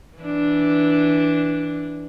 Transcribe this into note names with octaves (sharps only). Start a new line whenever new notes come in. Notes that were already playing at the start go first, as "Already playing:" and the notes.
E3 D4